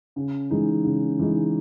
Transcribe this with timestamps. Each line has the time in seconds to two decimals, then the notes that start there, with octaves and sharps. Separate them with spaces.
0.16 C#3
0.50 E3 G#3 D#4
0.85 C#3
1.19 E3 G#3 D#4